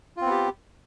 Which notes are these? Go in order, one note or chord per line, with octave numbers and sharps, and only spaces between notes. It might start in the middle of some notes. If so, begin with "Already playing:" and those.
B3 C4 F4 G4